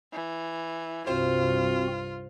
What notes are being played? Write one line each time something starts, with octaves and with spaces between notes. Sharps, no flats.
E3
C2 G2 C4 F4 F#4 C5